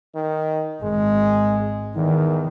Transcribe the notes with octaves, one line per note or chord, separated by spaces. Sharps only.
D#3
G#1 G#3
E2 D#3